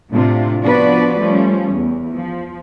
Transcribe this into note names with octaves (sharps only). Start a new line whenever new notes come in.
A2 C3 D4 F4
F3 B3 D4 F#4 B4 D5
F3 G3 A3 C#4
E2
F3